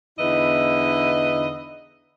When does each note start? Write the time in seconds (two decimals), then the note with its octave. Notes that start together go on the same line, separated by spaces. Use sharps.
0.18 E2 D3 D#4 E4 B4 D#5